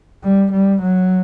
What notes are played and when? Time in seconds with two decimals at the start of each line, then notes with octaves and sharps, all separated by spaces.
0.23 G3
0.52 G3
0.82 F#3